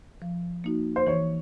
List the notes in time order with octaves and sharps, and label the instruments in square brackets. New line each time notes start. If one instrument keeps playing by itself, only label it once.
[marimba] F3
A#3 D#4 F#4
[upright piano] C5
[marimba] E3 [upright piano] C#5